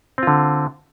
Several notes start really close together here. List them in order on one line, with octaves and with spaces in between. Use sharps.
C4 F4 D3